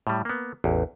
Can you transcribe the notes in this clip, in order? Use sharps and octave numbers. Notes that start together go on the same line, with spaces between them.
A2 G3
A#3 B3
A1 E2